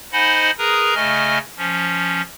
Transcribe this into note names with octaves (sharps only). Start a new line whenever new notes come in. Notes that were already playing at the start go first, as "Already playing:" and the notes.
D#4 C5 D#5 F#5 G#5 B5
G#4 A#4 B4 A#5 D#6
C#3 A3 D#5 G#5 F6
F3 C#4